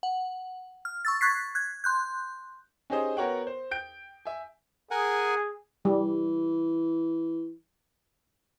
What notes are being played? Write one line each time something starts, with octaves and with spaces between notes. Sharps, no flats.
F#5
F6
C#6 E6 A6
C#6 F#6 G#6 A6 B6 C7
F#6 G#6
C6 F#6 G6
C#4 D#4 G4 G#4 C5 D#5
B3 F#4 A#4 C#5 F#5 G5
C5
G5 G6 D7
E5 G#5
G#4 A#4 F#5 G#5
E3 G3